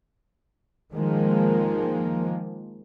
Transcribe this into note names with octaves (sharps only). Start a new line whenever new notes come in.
D#3 F3 G#3 A#3